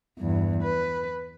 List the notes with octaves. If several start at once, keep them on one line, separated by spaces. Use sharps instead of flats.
E2 G2
B4